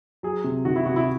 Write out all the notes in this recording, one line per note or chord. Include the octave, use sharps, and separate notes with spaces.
F#3 G#4
C3
D#3 F#4
E4
C3 F#4
E4